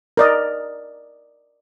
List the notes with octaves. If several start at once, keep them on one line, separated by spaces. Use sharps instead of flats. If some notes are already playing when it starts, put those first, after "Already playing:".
A#4 D5 D#5